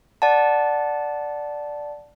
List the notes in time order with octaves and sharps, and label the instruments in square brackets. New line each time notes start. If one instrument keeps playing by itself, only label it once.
[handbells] D5 F#5 A5